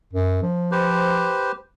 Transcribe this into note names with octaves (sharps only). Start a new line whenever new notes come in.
F#2
F3
G4 B4 C5